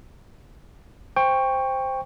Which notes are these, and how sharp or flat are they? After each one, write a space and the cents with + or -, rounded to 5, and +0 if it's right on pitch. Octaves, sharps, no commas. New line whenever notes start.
C5 +0 G5 +20 C#6 +0